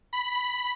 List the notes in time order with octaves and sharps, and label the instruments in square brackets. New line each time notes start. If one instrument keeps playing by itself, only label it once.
[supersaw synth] B5